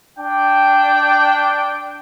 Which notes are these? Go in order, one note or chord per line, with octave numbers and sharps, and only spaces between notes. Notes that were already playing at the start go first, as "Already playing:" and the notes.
D4 G5